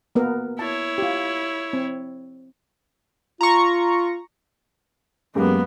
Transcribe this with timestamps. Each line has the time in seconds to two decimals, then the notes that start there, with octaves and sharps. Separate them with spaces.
0.15 A#3 B3 A#4
0.59 E4 C#5 A5
0.98 F4 G4
1.73 C4
3.41 F4 A#5 C#6
5.35 F#2 G#3 A#3 B3 G4